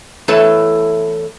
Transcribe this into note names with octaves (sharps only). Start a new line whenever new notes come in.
E2 A3 E4 A4 B4 C#5